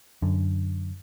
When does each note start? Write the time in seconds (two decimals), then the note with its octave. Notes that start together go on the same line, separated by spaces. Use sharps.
0.22 F#2 D3